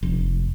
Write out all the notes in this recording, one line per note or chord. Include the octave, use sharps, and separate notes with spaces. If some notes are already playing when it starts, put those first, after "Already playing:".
F1